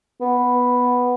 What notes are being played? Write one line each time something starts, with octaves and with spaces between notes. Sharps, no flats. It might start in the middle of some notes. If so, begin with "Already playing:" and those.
B3